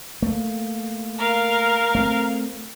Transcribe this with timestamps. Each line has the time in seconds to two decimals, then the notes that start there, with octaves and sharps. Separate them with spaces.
0.22 A3 A#3
1.18 A#4 F5
1.95 A3 A#3 C4